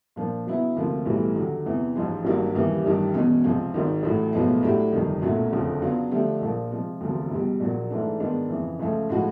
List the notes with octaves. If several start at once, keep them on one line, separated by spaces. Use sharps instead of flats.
A#2 F3 A#3 D4
C#3 F#3 B3 E4
D2 C3 F3 A#3
B1 A2 E3 G3
D#2 D3 F#3
E2 C3 E3
A1 G#2 F3 G#3
G#1 G2 D#3 F#3 A#3
D#2 C#3 E3 G3 A#3
A1 G2 D#3 G3
E1 E2 B2 G#3 C#4
C#2 C3 F3
G#1 G#2 D#3
A1 A2 F#3
B1 A2 F3 G#3 B3
A2 F#3 A3 D4 G4
G1 F2 C3 D#3
B1 A#2 F#3 A3 C#4
F#1 F2 D3 F3
C#3 F#3 B3 D4 F4
D3 F3 A3 D4 G4
A#1 A#2 F3 A#3
C3 F3 G#3
E1 D2 C3 F3
C#2 B2 G3
A#1 A#2 F#3 A#3
G#2 E3 A3 D4
G#2 D#3 G#3 B3 D4
F2 C#3 E3
C#2 C#3 F3 A3 C#4
A2 F3 G#3 C#4 F#4